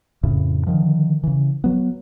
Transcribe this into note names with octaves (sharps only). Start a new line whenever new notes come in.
F2 A2 C#3
D3 D#3 F3
C#3 E3
F#3 B3